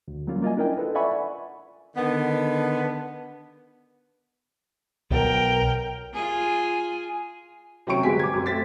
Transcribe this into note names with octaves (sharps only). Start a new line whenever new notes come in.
D2
F#3 G3 A#3 C#4 F4
A#3 F4 D#5 G#5
C#4 D4 E4 A#4 D#5 G5
F4 A4 B4
D5 E5 F#5 G#5 B5 C#6
D3 D#3 B3
B1 A#4 G5
F4 G#4 G#5
C3 F#3 C4 C#4 C#6 D7
G1 F#3 G#3 G#5 B6
D6 G#6
F#2 C4 D6
A3 C4 A6 B6